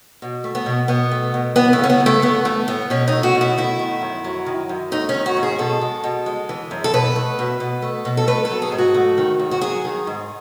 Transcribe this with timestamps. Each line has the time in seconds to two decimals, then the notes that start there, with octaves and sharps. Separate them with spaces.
0.22 B2
0.44 A3
0.55 B3
0.66 B2
0.88 B2 B3
1.11 A3
1.34 B2
1.56 E3 B3
1.73 A3
1.78 C#3
1.84 C#4
1.90 B3
2.00 F#2
2.06 A3
2.22 A3 B3
2.45 E3 A3
2.68 A2 B3
2.90 B2 C#4
3.08 A3 D#4
3.23 F#4
3.35 B2
3.41 E4
3.58 A3 E4
3.79 D#3
4.02 F#2
4.24 F#3
4.46 D#3
4.69 F#2
4.92 A3 D#4
5.09 C#4
5.14 D#3
5.26 F#4
5.37 G#2
5.43 G#4
5.58 B2 A4
5.81 G#3
6.04 B2
6.26 G#3
6.49 E3
6.71 F#2
6.84 A4
6.93 B2 B4
7.16 A3
7.39 B2
7.60 B2
7.82 A3
8.05 B2
8.17 A4
8.27 A3 B4
8.45 A4
8.50 F#3
8.62 G#4
8.72 G#2
8.78 F#4
8.94 A3
9.18 D#3
9.40 G#2
9.51 F#4
9.61 F#3 G#4
9.85 D#3
10.07 G#2